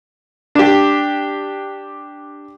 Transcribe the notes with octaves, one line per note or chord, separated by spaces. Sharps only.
D4 G4